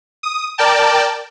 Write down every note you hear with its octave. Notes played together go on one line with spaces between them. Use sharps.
D#6
A#4 D5 G5 A5